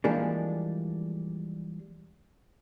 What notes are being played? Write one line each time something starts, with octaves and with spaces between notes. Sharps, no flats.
E3 F3 G3 G#3 A#3 D4